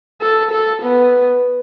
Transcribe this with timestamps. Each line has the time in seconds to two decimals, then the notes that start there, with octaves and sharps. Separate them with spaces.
0.21 A4
0.51 A4
0.82 B3